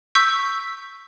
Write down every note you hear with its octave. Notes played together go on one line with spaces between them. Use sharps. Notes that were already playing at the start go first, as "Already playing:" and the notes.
C#6 E6 G6 B6